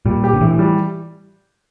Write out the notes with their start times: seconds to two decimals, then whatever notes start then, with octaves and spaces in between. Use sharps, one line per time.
0.06 A#2 G3
0.24 G4
0.33 D3
0.41 A2 E3
0.59 G3